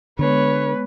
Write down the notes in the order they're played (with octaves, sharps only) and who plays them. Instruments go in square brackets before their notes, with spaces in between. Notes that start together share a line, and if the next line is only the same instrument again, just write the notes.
[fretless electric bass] D3 [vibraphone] G#3 B3 [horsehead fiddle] B4 [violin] C#5